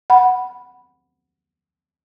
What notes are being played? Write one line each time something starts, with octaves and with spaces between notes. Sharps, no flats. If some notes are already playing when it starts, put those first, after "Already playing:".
F#5 B5